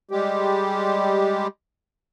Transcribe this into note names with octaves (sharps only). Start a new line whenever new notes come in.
G3 G#3 G4